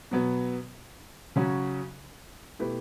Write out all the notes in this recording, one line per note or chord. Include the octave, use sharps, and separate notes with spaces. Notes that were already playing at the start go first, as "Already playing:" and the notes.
B2 F#3 B3
C#3 F#3 C#4 F#4
B2 A3 E4 G4 B4